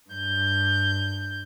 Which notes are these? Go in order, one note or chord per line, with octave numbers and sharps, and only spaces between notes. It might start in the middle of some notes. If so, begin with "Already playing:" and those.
G2 G6